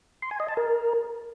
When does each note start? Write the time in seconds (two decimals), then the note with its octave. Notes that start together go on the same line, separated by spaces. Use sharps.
0.22 C6
0.31 G#5
0.40 D#5
0.48 A5
0.57 A#4